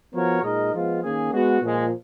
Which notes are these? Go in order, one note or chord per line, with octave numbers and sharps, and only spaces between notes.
F3 B3 F#4 A#4 C#5
A#2 G#3 D#4 A#4 D#5
F3 G#3 B3 F4
D#3 A#3 C#4 G#4
G#3 B3 F#4
A#2 F3 G#3